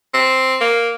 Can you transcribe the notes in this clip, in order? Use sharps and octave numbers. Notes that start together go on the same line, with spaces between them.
C4
A#3